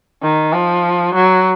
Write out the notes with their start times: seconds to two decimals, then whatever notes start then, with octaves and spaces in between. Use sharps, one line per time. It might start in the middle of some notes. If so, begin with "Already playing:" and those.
0.23 D#3
0.53 F3
1.14 F#3